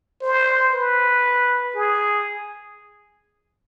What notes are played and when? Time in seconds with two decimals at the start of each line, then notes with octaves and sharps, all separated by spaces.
0.22 C5
0.73 B4
1.75 G#4